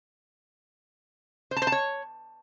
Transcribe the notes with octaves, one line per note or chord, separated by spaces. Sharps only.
C5
A5
C5
A5
C#5